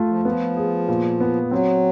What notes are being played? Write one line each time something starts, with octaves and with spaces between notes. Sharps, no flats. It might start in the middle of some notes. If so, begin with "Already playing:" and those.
Already playing: A3 F4
F3
F3 B3
G#4
A#2
B3
F#3 C4